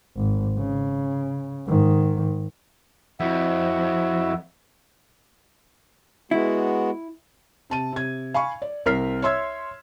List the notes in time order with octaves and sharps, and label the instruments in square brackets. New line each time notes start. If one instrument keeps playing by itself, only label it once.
[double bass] G#1
C#3
G#2 D#3
[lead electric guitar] F2 [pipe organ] E4 F#4 E5
[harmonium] G#3 B3 F#4 [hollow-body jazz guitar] E4
[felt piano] C3 A5 D#7
C3 G#6
F5 G#5 B5 C#6
D5
C2 C4 A#4 F6 B6 C7
C#5 E5 C6 E6 G#6